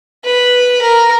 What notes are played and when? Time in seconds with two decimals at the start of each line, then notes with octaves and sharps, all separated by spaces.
0.25 B4
0.82 A#4